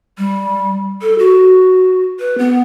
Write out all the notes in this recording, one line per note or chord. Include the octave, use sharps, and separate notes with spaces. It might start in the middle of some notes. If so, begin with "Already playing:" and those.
G3
A4
F#4
B4
B3